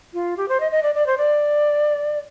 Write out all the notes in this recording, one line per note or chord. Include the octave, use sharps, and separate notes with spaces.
F4
G4
C5
D#5
D#5
D5
D5
C5
D5